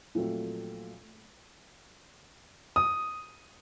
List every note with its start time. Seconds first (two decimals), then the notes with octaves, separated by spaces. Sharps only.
0.15 A#2 F3 F#3 A3 C4
2.76 D#6